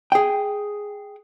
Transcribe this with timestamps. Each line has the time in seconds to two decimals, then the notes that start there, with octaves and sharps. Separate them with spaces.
0.12 G#4 G5